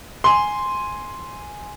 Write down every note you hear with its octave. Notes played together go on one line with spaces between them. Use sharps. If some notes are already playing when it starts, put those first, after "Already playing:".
G#5 C6